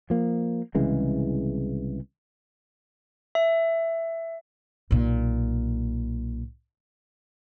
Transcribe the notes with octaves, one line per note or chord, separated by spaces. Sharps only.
F3 A#3
C2 C#3 E3 G#3
E5
B1 A#2